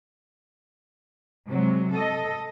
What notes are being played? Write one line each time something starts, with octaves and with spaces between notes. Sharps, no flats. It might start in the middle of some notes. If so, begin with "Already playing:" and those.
C3 F#3 G#3
A4 D#5